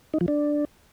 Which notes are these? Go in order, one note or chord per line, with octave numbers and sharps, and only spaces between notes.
D#4
F3
D4